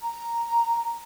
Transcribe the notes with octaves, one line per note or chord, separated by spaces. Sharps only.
A#5